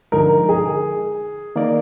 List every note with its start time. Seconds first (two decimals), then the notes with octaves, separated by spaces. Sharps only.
0.12 D3 F3 G#3 D#4 A#4
0.49 G#4
1.56 D#3 A#3 D#4 A#4 D5